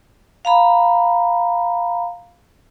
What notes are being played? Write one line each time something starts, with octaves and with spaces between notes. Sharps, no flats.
F5 A#5 B5